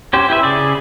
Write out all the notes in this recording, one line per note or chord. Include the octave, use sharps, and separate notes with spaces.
C#4 G4 C5
E4 G4 B4 E5
C#3 G#4 D5